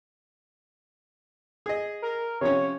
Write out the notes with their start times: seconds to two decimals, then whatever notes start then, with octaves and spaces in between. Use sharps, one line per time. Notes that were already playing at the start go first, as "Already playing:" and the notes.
1.66 G#4 D#5
2.02 A#4
2.41 C3 F3 C#4 C#5